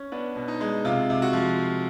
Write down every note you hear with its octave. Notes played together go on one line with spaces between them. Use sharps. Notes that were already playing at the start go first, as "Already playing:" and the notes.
Already playing: C#4
B3 D4
B2
D#4
G#3
C3 F4
C3
F#4
F3